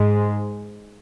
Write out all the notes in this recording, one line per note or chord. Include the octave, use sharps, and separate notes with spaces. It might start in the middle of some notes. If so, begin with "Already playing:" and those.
Already playing: G#2 G#3